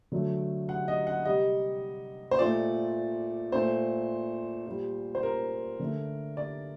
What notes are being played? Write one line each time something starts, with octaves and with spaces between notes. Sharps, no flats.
D3 F#3 A3
F#5
D#5
F#5
C3 G3 D#5
C5
A#2 A3 D5
A#2 A3 C5
A#2 G3
C5
A#4
D3 A3
D5